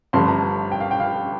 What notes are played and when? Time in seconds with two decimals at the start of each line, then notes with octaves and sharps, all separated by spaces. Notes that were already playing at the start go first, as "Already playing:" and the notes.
0.13 G1 G2 F3 A3 C6
0.28 A#5
0.72 G5
0.80 F5
0.91 G5
1.00 F5